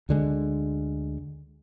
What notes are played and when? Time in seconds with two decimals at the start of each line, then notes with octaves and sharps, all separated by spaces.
0.09 D2 D3 G#3